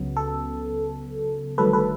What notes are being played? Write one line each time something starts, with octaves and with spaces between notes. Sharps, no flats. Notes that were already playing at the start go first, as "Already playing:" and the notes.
Already playing: C#2 C#3 F#3 B3
A4
G1 G2 D#3 F#3 A3 A4 B4
A4 B4